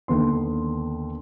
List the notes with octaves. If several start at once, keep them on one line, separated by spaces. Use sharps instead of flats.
D#2 D3 B3 C6